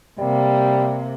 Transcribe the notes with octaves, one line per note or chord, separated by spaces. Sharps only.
C3 G3 A#3